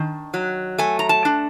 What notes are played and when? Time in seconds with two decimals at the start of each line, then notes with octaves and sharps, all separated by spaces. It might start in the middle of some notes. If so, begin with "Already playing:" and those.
Already playing: D#3 D4
0.34 F#3
0.78 A3 G#5
0.99 A#5
1.09 A5
1.25 D4